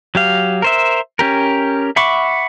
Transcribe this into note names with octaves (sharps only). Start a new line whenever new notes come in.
F#3 G4 F5
A#4 C5 E5
C#4 G4 A#4
E5 F#5 B5 C#6 D6